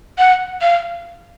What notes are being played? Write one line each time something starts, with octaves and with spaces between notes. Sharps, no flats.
F#5
F5